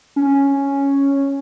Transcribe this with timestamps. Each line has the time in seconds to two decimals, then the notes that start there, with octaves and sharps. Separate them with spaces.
0.16 C#4